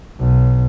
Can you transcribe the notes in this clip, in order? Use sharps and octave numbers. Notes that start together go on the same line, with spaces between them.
B1